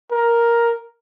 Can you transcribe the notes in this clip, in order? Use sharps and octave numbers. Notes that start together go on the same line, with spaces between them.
A#4